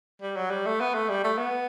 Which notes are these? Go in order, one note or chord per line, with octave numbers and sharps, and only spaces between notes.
G3
F#3
G3
A3
B3
A3
G3
A3
B3